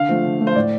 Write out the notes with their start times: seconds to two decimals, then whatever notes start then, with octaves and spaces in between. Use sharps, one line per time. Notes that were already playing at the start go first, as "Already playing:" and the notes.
Already playing: D3 F5
0.09 F3 A3
0.24 D3
0.40 F3 A3
0.47 C5
0.55 A2 D5